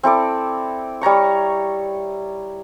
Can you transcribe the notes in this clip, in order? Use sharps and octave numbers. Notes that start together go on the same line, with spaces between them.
C4 E4 A4 D5
G3 C#5 A#5 C#6